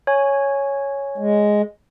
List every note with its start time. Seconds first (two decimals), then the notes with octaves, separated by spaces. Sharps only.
0.07 C#5 G#5
1.18 G#3